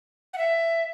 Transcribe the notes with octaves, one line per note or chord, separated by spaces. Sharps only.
F#5
E5